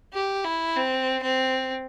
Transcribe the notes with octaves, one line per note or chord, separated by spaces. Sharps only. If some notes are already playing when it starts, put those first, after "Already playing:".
G4
E4
C4
C4